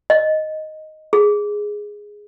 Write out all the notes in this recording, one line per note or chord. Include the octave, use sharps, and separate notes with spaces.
D#5
G#4